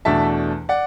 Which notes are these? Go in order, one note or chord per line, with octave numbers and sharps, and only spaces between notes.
E2 B2 A3 D4 E5 A5
D5 F#5